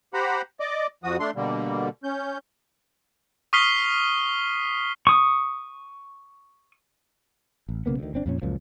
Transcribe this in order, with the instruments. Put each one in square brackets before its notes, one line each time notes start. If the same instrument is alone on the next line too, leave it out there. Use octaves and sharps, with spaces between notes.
[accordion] G4 C5 F#5 A#5 B5
D5 D#5 D6
F2 F3 F#4 D#6
A3 D4 C6
B2 D3 G3 A#3
C#4 G6
[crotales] C#6 D#6 F6 B6 C7 G7
[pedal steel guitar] C#6 D#6
[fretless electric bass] A1
B1 C#3 A#3 B3
D2 D#3
G1 C4 D4
F2 A#2 C#4
C#2 F#2 A#2 F3